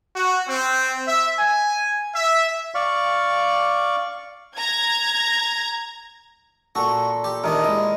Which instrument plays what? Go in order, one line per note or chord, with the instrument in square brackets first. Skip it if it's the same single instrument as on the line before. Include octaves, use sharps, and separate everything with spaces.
[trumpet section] F#4
C4
E5
G#5
E5
[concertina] D5 F5 C#6
[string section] A#5 G#6
[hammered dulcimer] A#2 A4 [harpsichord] F#4 C#6
[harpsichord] G4
[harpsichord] C3 D#3 D4 [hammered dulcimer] A#4 D#5
[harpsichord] G#3 E4